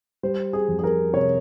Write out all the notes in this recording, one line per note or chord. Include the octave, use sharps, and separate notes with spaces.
G3 C5
G#4
F2
G#4
A#4
C3 C#5